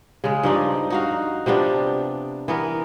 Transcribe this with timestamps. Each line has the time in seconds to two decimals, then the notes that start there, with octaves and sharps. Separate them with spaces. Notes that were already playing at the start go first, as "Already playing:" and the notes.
0.24 C#3 G#3
0.43 G2 F3 D#4 D5
0.90 D#4 F#4 F5
1.46 C3 F3 B3 D4
2.48 E3 B3 A#4